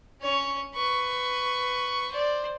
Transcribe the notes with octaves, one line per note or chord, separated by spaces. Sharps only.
C#4 C#5
B4 C#6
C5 D5